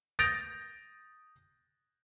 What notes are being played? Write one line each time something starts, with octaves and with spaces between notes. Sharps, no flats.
D#6 G6 A6 A#6 D7 F7